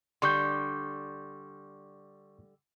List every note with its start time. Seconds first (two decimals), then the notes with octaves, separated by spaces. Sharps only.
0.22 D3 G3 C6 C#6 G6